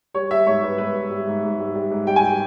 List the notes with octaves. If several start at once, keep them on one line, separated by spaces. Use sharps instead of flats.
G3 C#5
G3 E5
G#2 C#5
G3 B4
G#2 B4
G3
G3
G#2
G#2
G3
G3
G#2
G3 G5
G#5
G3 G5